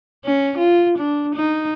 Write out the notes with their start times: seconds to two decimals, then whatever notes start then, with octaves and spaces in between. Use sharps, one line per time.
0.25 C#4
0.58 F4
0.98 D4
1.35 D#4